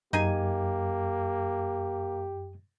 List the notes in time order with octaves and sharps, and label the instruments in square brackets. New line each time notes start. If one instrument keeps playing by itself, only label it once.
[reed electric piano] F#2 [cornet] A#3 [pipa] D#4 G#4 G#5 [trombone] G4